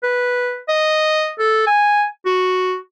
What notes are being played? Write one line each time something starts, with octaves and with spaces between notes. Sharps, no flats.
B4
D#5
A4
G#5
F#4